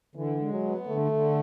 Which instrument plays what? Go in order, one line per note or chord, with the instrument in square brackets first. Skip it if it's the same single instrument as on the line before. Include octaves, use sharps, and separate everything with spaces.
[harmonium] D3 [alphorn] E3
[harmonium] G#3
[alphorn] F#3
[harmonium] B3
[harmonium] D3 [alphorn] A3
[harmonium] D3